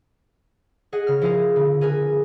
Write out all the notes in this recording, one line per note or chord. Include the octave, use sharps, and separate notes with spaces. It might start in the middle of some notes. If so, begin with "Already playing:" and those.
G#4 D#5 F#5
C#3 F6
F3 E4 F4 G#4 A#4
D3
G#4 A#4 B4 G#5